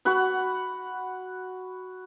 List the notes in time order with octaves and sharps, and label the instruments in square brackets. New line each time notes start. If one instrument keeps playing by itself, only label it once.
[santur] F#4 F#5 B5